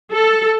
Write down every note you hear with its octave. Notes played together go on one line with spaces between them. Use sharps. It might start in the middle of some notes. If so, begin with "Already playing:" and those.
A4